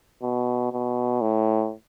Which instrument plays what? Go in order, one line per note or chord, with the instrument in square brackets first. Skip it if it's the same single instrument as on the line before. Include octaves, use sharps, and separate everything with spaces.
[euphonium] B2
B2
A2